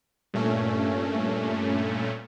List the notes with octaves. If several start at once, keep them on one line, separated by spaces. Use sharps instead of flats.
G2 A#2 A3 C#4